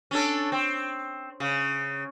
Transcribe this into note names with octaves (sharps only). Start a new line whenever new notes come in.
C#4 D4 A4
C4
C#3